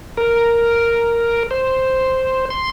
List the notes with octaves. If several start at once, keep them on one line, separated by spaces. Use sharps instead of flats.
A#4
C5
C6